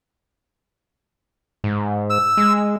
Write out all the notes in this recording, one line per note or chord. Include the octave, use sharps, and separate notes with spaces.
G#2
E6
G#3